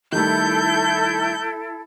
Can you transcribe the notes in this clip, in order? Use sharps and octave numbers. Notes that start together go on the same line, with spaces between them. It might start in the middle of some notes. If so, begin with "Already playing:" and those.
D#3 G3 A3 E4 A4 G6